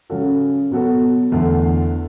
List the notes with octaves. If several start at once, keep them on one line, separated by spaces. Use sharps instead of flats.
C#3 F#3 C#4 F#4 A4
B2 F#3 B3 F#4 A4
E2 D3 A3